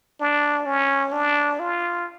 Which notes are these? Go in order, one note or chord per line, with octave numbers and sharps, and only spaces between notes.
D4
C#4
D4
F4